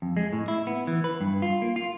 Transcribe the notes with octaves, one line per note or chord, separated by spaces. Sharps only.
F2
G#3
A2
E4
B3
E3
B4
G2
F4
A#3
F4